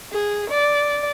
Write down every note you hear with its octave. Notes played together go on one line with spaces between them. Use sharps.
G#4
D5